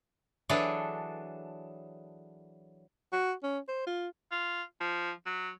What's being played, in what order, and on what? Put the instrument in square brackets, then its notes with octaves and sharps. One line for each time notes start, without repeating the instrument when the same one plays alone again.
[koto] E3 F#3 D4 G#4 A4
[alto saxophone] F#4
C#4
C5
F4
[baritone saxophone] F4
F3
F#3